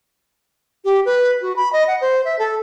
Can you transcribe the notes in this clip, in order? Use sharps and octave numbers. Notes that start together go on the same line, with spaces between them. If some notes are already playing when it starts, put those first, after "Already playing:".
G4
B4
F#4
B5
D#5
F#5
C5
E5
A4